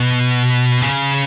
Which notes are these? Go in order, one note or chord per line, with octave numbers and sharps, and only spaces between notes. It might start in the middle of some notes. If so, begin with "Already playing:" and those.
Already playing: B2
C#3